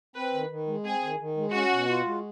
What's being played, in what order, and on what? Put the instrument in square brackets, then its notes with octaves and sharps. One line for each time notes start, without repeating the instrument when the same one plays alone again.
[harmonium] C4 [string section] B4
[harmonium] D#3
D#3
G#3
[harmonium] C4 [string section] G#4
[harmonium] D#3
D#3
G#3
[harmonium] C#4 [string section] F#4
[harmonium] B2
F4
G#3